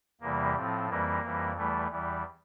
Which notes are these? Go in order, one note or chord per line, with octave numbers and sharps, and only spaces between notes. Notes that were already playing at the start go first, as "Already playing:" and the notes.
E2 C3 E3 G3 A#3
A2 F3 C4
F2 E3 G3 A#3
F2 E3 G3
E2 E3 G3 A3
E2 E3 G3